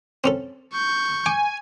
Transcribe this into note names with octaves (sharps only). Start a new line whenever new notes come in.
C4 C#4 A4
C#6 G6
G#5 D6